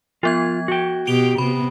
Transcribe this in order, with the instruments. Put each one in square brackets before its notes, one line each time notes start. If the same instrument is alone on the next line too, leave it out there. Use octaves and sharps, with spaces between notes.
[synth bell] F3 B3 G#6 [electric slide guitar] F4
[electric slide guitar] F#4 G5
[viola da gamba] B2 G4 [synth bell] D7 F7 G7
[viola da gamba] C3 B3 [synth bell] B5